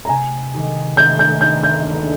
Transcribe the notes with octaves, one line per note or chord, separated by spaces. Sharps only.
A#5
C3 G#5
D#3 G#3 D#4 G4
D#3 G6
G6
A#3 D#4 G#4 G6
G6
D2